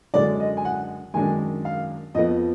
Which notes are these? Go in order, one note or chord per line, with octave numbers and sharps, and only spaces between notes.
F#2 D3 G#3 D5
D#5
G#5
F#5
F#2 D#3 G#3 D4 G#5
F5
F2 F3 B3 D#5